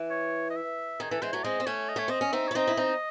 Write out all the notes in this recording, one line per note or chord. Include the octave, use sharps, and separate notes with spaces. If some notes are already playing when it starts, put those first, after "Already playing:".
Already playing: E3
C#5
D#5
E5
D#3 G#4
E3 A4
E3 G#3 C5
F#3 A3 C#5
G#3 C4 D#5
C4
A3 C#4 C#5
D#5
A3 C#5
C4 D#5
C#4
C4 D#4 E5
C#5
E4
C4 D#4 D#5
E4
C4 D#4